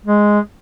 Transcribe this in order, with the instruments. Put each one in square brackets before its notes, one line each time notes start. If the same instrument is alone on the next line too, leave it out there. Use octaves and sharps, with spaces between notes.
[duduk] G#3